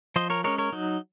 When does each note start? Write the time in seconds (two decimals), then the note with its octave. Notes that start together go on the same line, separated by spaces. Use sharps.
0.16 F3 C5 D#5
0.30 A#4 C#5
0.44 G#3 C#4 A#4 C#5
0.58 A#4 C#5
0.72 F#3 D#4